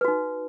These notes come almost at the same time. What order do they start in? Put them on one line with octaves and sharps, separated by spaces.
B4 F#4 D#4